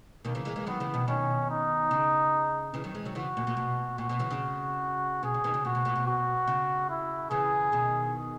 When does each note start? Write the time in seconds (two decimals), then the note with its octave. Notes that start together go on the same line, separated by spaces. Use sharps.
0.25 B2 D#3 A#3
0.35 C#3 E3
0.45 E3 G#3
0.56 E3 G#3
0.67 D#3 F#3 B3
0.80 C#3 E3
0.94 B2 D#3
1.08 B2 D#3 C#4
1.50 D#4
1.91 C#3
2.74 C#3 E3
2.84 D#3 F#3
2.95 E3 G#3
3.05 D#3 F#3
3.15 C#3 E3 F#4
3.37 A#2
3.47 A#2
3.57 B2
3.98 A#2 F#4
4.09 B2
4.19 C#3 E3
4.31 C#3
5.23 B2 G#4
5.34 C#3
5.44 B2 D#3
5.54 C#3
5.65 A#2 F#4
5.75 B2
5.85 A#2
5.96 B2
6.06 F#4
6.47 C#3
6.90 E4
7.30 C#3 E3 G#4
7.72 B2 D#3